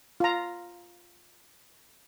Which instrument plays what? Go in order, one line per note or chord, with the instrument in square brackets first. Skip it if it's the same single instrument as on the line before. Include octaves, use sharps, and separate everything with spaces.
[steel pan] F4 A#5